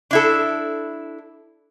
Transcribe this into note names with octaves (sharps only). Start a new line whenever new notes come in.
D4 E4 A4